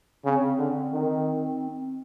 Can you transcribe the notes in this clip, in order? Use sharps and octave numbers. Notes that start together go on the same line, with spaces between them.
C#3 C4
D3
D#3